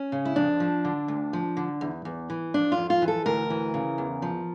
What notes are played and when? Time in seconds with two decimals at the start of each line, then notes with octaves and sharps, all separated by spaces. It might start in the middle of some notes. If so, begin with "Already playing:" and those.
Already playing: C#4
0.12 C#3
0.25 E4
0.36 F2 D4
0.60 F3
0.85 D3
1.08 D2
1.33 F3
1.57 D3
1.81 E2
2.05 E2
2.30 E3
2.54 F2 D4
2.72 F4
2.78 F2
2.90 F4
3.02 E3
3.08 A4
3.26 D2 A#4
3.50 E3
3.74 C#3
3.98 E2
4.22 F3